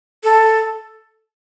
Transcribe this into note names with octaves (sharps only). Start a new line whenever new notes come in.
A4